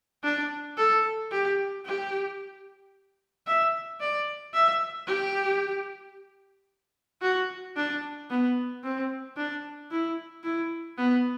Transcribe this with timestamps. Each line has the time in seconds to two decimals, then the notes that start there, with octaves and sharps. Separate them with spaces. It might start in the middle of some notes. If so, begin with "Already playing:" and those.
0.24 D4
0.77 A4
1.32 G4
1.86 G4
3.46 E5
4.00 D5
4.54 E5
5.07 G4
7.21 F#4
7.76 D4
8.30 B3
8.84 C4
9.36 D4
9.91 E4
10.44 E4
10.97 B3